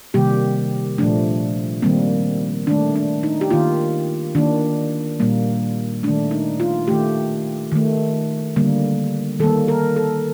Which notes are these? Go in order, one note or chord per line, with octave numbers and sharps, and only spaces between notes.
C3 D#3 G3 A#3 G4
A#2 F3 A3 D4
D#3 G3 A#3 C4
D#3 A3 D4
D4
D#4
G4
D#3 A#3 F4
D#3 A#3 D4
A#2 G3 A#3
D#3 A3 D4
D#4
F4
D#3 A3 G4
D#3 A3
D3 G3 A#3
D#3 G3 A#3 A4
A#4
A4